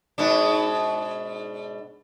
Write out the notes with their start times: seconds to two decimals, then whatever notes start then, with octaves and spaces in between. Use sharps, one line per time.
0.18 G#2 B2 D4